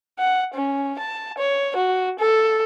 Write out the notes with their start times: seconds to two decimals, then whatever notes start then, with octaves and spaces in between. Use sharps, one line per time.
0.19 F#5
0.54 C#4
0.99 A5
1.38 C#5
1.76 F#4
2.19 A4